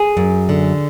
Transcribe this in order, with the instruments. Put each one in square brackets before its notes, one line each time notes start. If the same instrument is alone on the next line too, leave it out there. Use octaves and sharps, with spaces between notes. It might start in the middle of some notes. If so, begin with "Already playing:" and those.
Already playing: [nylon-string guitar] G#4
F#2
D3